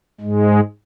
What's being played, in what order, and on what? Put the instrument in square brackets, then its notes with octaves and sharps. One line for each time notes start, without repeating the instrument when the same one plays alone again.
[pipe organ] G#2 G#3